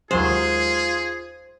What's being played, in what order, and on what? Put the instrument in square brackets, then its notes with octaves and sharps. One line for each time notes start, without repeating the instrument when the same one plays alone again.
[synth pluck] D#2 F#3 G#3 [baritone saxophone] F4 [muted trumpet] G#4 [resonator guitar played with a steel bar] C5